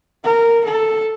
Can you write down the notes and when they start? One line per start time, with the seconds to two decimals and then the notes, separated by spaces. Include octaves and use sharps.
0.24 A#4
0.65 A4